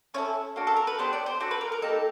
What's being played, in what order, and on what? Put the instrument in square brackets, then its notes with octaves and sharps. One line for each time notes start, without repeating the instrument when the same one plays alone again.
[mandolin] C#4 E4 A4 C#5
A#3 D4 F#4 A4
A4
A#4
B4
B3 D4 G4 C5
D5
C5
D4 F#4 A4 C5
B4
A#4
A#4
A#3 D#4 G4 A4